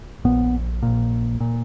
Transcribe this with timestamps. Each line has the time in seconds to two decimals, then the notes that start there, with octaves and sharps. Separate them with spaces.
0.25 A#1 A#2 B3
0.83 A#1 A#2
1.40 A#2